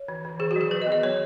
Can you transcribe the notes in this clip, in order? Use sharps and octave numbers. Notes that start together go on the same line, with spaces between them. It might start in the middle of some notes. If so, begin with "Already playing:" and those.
Already playing: C#5
E3
E3
D#3 G#4
F#4
F#3 G#4
D#3 B4
D#5
B3
D#5
B3 C#5